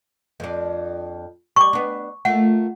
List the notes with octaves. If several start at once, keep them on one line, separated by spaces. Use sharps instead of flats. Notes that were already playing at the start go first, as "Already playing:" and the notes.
F2 D4
G3 C#6 D6
B3 D4
A3 A#3 F4 F#5